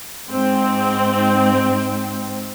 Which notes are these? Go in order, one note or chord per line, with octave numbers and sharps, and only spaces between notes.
G#2 C4